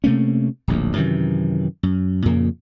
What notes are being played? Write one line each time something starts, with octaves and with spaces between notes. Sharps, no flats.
C3 A3 A#3 C#4
D1 A#1 D#2
F#2 C3 D#3 E3
F#2
F2 A#2 C#3 A#3